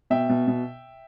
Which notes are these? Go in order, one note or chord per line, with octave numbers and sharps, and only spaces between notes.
B2 E5 G5
B2
B2